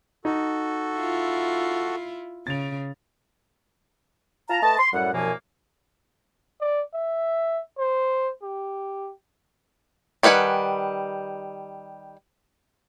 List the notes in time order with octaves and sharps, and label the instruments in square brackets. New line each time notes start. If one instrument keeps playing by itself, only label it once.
[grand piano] D#4 [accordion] F#4 A4
[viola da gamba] E4 F4
[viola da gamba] C#3 [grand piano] A6 F7
[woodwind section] F4 F5 A5 A#5
A3 B4 D#5 A5
C6
F#2 A2 G3 F#5
C2 F#2 B2 F3 A#3 G#5
[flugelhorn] D5
E5
C5
G4
[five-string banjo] D#3 G3 B4 F#5 G#5